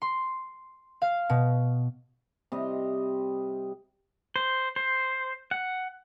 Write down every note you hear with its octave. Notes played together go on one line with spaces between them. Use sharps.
C6
F5
B2
C3 G3 D#5
C5
C5
F#5